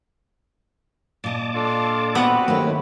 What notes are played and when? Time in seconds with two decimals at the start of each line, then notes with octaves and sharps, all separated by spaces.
1.24 A#2 D5 D#5 A5 D6
1.55 D4 F4 A4
2.15 B3 C4 F#4 B4 F#5
2.48 D#3 F#3 A3 A#3 C#4 G4